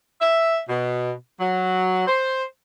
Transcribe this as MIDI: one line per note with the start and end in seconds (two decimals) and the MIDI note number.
0.21 0.58 76
0.69 1.12 47
1.40 2.04 54
2.08 2.43 72